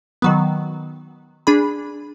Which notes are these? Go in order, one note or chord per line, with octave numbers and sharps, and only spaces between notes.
D#3 F#3 B3
D4 G#4 B5